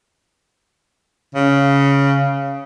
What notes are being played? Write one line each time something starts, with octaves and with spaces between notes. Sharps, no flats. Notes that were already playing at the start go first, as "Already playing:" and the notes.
C#3